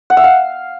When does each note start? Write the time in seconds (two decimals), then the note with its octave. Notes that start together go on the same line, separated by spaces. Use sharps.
0.10 F#5
0.17 E5
0.24 F5